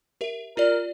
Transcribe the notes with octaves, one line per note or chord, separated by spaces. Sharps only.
G4 A#4 E5
F4 G4 A#4 D5